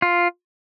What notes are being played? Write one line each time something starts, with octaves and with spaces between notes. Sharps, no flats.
F4